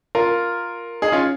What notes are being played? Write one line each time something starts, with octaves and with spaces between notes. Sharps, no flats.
F4 A#4
D#4 G#4
C#4 F4